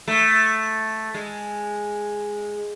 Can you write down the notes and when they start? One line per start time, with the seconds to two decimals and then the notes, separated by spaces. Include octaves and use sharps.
0.08 A3
1.14 G#3